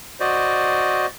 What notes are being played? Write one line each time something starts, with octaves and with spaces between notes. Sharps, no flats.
F#4 C5 D5 D#5